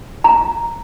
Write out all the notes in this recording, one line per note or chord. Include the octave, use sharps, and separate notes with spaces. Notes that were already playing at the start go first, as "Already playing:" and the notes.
A#5